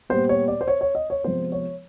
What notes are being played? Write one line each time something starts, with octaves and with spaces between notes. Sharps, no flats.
A#2 G3 B3 C5
C#5
D5
C5
C#5
C#5
D#5
C#5
C3 F3 G#3 B3 C5
C#5